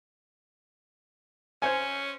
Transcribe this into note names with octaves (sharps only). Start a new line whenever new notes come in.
C#4 C5 C#5 G#5